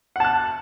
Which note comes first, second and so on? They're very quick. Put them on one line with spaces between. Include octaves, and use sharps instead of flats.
F#5 A5 F#6